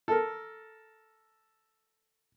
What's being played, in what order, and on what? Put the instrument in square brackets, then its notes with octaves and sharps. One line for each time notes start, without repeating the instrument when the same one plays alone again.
[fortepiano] A4 A#4